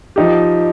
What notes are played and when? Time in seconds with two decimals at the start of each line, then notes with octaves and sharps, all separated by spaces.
0.16 F3 D#4 G4